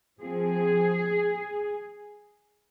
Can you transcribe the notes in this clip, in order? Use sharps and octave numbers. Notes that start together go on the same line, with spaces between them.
F3 C4 G#4